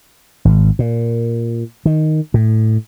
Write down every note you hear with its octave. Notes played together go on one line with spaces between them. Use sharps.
G#1
A#2
D#3
A2